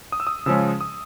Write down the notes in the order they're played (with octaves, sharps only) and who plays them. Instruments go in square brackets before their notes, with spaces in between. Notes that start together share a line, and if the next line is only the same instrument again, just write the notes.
[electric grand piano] D#6
E6
D#6
C#3 F3 G#3 C#4 E6
D#6